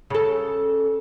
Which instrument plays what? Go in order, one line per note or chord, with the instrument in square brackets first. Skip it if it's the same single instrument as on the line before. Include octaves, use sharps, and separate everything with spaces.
[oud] C#3 A4